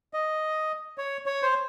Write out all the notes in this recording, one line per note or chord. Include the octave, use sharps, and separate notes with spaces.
D#5
C#5
C#5
C5